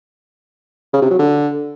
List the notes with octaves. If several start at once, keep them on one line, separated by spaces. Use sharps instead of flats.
C#3
C3
F#3
D3